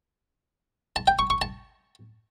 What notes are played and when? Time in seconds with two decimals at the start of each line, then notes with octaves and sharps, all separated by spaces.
0.96 A5
1.07 G5
1.19 C#6
1.30 C#6
1.42 A5